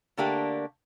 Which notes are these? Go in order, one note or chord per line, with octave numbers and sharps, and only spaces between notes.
D3 A3 A#3 D4 G4